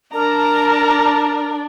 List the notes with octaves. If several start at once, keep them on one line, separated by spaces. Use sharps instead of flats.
D4 A#4 D5 A5 A#5